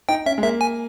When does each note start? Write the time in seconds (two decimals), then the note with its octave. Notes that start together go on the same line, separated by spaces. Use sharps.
0.09 D#4 G5
0.26 C#4 E5
0.38 G#3
0.43 A#3 E5
0.61 G#5